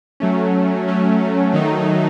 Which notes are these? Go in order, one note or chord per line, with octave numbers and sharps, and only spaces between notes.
F#3 A3 C#4
F#3 A3 C#4
D#3 F#3 A3 D#4